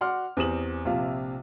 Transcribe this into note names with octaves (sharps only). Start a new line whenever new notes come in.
F#4 D5 F#5 C6 D6 F6
E2 C4 G4 D#6 E7 F#7
A#1 C3 F4 F5